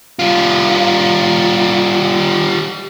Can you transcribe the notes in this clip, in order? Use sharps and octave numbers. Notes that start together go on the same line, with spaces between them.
G3 F4